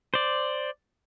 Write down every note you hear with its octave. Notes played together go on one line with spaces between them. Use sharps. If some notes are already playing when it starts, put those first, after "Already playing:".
C5 D5